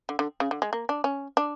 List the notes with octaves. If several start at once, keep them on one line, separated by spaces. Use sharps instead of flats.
D3
D3
C#3
D3
G#3
A#3
D4
C#4
D4